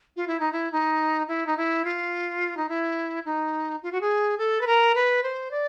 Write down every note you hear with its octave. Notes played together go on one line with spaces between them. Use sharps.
F4
E4
D#4
E4
D#4
E4
D#4
E4
F4
D#4
E4
D#4
F4
F#4
G#4
A4
B4
A#4
B4
C5
D5